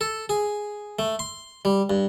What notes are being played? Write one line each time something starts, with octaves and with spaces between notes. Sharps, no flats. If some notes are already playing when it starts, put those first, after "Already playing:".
A4
G#4
A3
C6
G3
G2